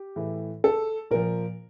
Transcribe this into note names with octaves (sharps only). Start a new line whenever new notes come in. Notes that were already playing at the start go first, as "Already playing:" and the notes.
Already playing: G4
A2 E3
A4
A#2 F3 A#4